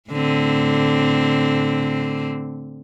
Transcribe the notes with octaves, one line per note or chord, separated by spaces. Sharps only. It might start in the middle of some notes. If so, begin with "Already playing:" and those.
A2 D3 C4